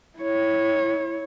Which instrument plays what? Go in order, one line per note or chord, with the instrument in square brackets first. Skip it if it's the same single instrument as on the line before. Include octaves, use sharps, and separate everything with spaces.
[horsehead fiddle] E4 C#5